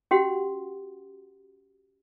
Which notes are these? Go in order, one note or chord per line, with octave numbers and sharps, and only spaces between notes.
C#4 F#4 G4 F#5 C6